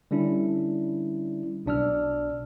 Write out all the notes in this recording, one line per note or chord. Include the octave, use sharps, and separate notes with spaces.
D3 G3 C#4 D4 E4
B1 B2 D4 D5 E6 F6